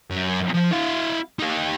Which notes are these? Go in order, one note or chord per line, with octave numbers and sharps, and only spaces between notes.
F#2
F3
E4 F5
D#4 G4